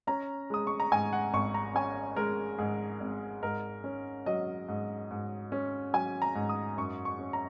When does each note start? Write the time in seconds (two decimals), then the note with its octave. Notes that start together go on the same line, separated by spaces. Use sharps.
0.07 C#4 A#5
0.50 G#3 D#6
0.67 C#6
0.80 A#5
0.92 G#2 G#5
1.13 F#5
1.33 G#1 C#6
1.54 A#5
1.75 C#4 G#5
2.16 G#3 A#4
2.58 G#2 G#4
3.00 G#1
3.43 G#2 A#4
3.84 C#4
4.26 F#3 D#5
4.68 G#2
5.11 G#2
5.52 C#4
5.93 F#3 G#5
6.22 A#5
6.35 G#2
6.49 D#6
6.77 F#2 C#6
7.05 C#6
7.19 C#4
7.33 A#5